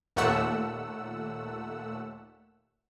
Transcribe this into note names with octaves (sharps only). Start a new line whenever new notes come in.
D#2 A#2 A3 F#5 E6